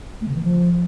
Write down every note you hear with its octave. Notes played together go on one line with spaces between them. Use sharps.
A3
C#3
E3
F3